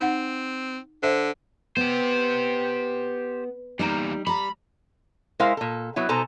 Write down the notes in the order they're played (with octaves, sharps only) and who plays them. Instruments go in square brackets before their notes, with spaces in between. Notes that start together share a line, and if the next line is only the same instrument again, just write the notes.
[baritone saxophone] C4 [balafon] D#4 F#5
[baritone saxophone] D3 [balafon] C5 E5
[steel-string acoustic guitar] B3 [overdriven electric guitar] G4 C5
[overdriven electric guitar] E2 A#3 [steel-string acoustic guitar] G3 D#4 A#5
[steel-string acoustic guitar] G3 A#5 [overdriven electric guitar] B5
[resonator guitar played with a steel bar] G#3 E4 A#4 C5 F5
A#2 A4
F#3 B3 E4
B2 D#4 A4 C5 G#5 A#5